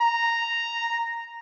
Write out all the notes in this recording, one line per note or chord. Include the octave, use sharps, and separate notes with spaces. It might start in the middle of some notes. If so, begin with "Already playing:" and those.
A#5